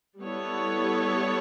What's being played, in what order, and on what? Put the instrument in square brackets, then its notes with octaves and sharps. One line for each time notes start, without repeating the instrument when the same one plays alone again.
[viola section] G3 B3 E4 A4 C#5